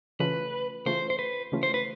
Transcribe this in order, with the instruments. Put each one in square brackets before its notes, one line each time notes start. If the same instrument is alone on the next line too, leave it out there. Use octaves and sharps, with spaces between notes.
[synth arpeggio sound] C#3 E3 A3 C#4 F4 [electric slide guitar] B4
[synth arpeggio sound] C#3 E3 A3 C#4 F4 [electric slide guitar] C5
[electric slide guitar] C5
B4
[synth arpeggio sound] C#3 E3 A3 C#4 F4
[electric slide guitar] C5
B4